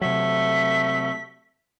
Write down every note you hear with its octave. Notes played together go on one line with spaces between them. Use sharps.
C3 F#3 A3 B6